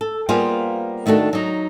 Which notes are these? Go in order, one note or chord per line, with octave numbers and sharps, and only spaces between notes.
A4
G3 A#3 B3 F4 G#4 C5
D#3 A3 D4 F#4 A4
F#3 D#4